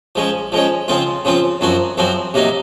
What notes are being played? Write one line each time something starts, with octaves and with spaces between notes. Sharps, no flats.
F3 G#3 C#4
F3 G#3 C#4
C#3 F3 C4 F4
C#3 F3 C4 F4
F#2 F3 C4 F#4
F#2 F3 C4 F#4
C3 F#3 A#3 D#4